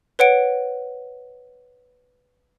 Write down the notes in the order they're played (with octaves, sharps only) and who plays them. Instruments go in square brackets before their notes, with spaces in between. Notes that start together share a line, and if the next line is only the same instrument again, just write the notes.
[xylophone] B4 C#5 F#5 D7